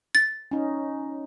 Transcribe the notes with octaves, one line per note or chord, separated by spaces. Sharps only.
A6
C#4 D#4